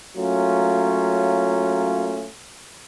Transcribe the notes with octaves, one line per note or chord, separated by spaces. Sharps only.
F#3 A3 A#3 C#4 F4